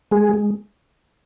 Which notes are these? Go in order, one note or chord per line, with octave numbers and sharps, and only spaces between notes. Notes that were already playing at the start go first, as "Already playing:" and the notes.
G#3 G#4
G#3